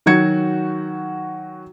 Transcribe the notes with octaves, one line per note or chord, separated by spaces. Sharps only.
D#3 F#3 F#4 G#6 C#7